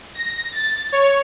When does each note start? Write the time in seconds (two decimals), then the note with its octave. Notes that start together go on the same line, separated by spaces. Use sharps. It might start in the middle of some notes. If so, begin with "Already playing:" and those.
0.15 A#6
0.52 A6
0.92 C#5